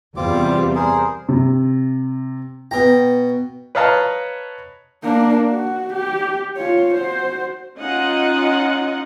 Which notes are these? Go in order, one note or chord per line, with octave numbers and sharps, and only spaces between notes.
E2 C3 G3 C4 F4 D6
G#4 A#4 C5
C3
B2 G5 A#5
B4 C#5 D#5 F5 A5 A#5
A#3 D4
F#4
G4
F4 C#5
F#4 C5
C#4 D#4 F4 D#5 F#5